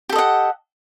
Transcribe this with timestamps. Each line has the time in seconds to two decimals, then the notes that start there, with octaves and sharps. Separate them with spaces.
0.09 G4
0.12 A4
0.15 D#5
0.18 F#5